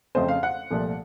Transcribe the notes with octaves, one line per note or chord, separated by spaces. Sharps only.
F2 C#3 A3 C4 C5
F5
F#5
C2 A#2 F3 A3